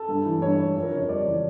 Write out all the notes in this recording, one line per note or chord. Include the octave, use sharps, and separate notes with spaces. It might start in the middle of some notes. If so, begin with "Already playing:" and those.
Already playing: A4
G2
E3
G2 C#5
G3
F2
A#4
C#3 C#5
G3 D5
E3